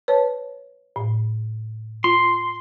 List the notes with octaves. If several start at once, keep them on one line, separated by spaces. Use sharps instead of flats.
B4 C#5 A5
A2
F4 C6